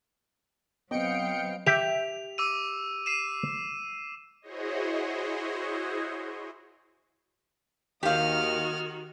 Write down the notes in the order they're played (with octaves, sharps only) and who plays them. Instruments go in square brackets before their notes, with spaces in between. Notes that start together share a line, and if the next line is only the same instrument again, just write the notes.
[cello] F#3 F5 [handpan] B3 C4 [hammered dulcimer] D#5 [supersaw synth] G5 C#7 D7
[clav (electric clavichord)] G4 E5 [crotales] F7
[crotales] D6 E6 D#7
C7 D#7 E7
[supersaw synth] E4 F#4 G#4 C5 C#5 D#5
[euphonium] D#2 [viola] D#3 F#4 [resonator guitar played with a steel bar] G4 F5 [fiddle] D#6 F6